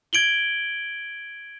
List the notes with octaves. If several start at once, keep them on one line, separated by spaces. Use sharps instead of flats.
G#6 D7 F#7 G7